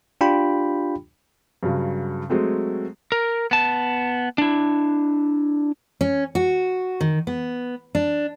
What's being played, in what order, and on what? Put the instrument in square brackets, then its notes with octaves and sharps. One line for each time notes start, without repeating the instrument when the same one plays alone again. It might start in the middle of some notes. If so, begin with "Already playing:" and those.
[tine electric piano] D4 F4 G4 G5 B5
[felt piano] G2 C#3 F#3
F#3 G#3 A3 C4
[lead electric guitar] A#4
B3 A5
D4 E4
[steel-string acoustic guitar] C#4
F#4
D#3
B3
D4